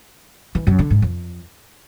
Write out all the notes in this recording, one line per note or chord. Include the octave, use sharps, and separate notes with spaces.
E3
F#2
D3
G#2
F2